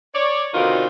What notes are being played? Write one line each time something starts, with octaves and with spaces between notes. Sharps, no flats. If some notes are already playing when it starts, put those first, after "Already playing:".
C#5 D5
B2 D3 D#3 C4 D#4 F4